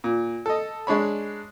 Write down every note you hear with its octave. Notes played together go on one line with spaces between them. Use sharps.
A#2
A4 D#5
G#3 D4 C#5 B5